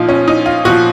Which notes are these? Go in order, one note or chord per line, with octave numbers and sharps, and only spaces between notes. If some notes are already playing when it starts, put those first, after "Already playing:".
Already playing: A#2 F3 D#4
C#4
D#4
F4
A#2 F3 F#4